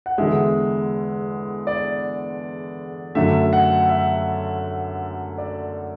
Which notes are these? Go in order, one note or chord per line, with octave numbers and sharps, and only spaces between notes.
F#5
E2 D3 G#3 E5
D5
F#2 D3 A3 E5
F#5
E5
D5